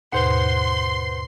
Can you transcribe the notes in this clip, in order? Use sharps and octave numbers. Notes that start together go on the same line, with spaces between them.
D#2 G#2 B2 B4 C5 F#5 C6